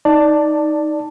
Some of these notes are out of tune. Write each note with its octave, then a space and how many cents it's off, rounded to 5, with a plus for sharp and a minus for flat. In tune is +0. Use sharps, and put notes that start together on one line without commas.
D#4 +10 D5 +0 A5 +10